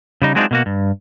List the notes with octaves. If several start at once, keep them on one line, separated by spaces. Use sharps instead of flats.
C#3 G3 D#4
F#3 G#3 C4 D4 D#4 F4
B2 A#3 F#4
G2